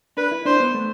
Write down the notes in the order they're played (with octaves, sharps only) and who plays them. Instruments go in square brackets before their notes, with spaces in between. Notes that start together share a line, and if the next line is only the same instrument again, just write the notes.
[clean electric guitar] D4 [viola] B4
[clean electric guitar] E4
[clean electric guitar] D4 [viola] C5
[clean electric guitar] B3
A3